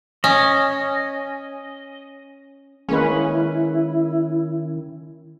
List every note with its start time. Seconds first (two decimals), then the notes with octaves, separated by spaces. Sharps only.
0.24 C#4 D#5
2.89 D#3 G#3 A#3 C#4 E4 B4